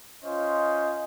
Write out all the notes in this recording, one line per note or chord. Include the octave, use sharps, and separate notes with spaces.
C#4 F4 C5 D#5